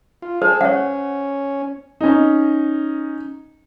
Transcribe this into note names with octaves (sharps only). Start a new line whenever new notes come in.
F4
G#4 A4 C5
C#4 C#5 F#5
C#4 D#4